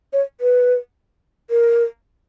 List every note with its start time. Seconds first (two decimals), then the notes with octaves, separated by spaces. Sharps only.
0.13 C#5
0.41 B4
1.50 A#4